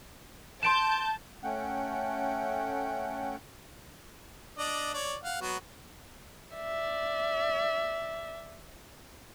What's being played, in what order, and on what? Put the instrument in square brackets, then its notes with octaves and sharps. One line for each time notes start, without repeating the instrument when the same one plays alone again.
[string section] A5 G6 [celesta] C6 D7 E7
[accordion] A3 C#4 F#5 G5
[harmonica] D4 D5 D#5
C#5 D5
F5 F#5
F#3 B3 F#4
[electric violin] D5 E5